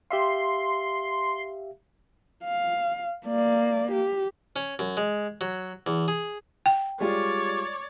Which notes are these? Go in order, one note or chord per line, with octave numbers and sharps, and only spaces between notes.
G4 E5 F5 C6
F5
A#3 D5
G4
C#4
F#2
G#3
F#3
E2
G#4
G5
G3 G#3 F4 C#5 D5